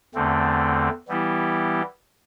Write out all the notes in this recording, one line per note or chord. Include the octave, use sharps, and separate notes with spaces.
E2 D3 A3 C4
E3 G3 B3 E4 G4